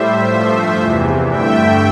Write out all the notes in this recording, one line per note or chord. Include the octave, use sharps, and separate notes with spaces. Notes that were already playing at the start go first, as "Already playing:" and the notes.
Already playing: A2 G3 C5 E5
G2 F3 A3
E2 C3 E3
G2 D3 A3 E5 G5